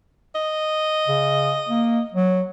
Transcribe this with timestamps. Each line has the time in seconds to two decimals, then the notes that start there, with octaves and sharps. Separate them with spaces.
0.35 D#5
1.08 C#3
1.69 A#3
2.13 F#3